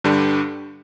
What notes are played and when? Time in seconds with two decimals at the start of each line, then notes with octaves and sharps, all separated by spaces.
0.04 G2 D3 G3 D4